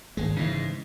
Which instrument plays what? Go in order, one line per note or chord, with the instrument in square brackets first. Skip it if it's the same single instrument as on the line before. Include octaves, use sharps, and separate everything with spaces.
[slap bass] G#1 G#3
[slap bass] G#2 [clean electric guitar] C#3 E3 G#3